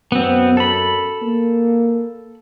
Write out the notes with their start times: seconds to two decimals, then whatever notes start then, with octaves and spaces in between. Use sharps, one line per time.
0.12 F#2 B3 C4
0.57 A4 B5
1.22 A#3